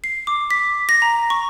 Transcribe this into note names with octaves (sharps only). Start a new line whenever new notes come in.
C7
D6
B6
A#6
A#5
C#6